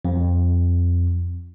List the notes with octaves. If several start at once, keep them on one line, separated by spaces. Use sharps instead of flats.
F2